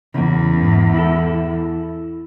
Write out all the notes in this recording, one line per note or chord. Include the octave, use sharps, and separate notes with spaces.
E2 C#3 A#3
G#2
E4 A4